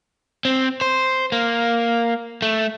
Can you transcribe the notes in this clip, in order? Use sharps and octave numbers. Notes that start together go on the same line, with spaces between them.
C4
C5
A#3
A3